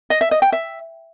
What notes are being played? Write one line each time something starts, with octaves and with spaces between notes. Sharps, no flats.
D#5
E5
D#5
G5
E5